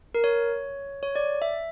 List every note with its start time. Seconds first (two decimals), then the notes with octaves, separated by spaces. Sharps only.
0.14 A#4
0.24 C#5
1.03 C#5
1.16 D5
1.42 E5